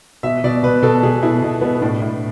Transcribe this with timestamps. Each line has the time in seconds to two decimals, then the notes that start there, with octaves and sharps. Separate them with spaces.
0.23 B2 E5
0.44 B2 D5
0.63 B2 B4
0.82 B2 A4
1.03 B2 G#4
1.23 B2 E4
1.42 B2
1.61 B2 B3
1.81 A2 D4
2.02 A2 E4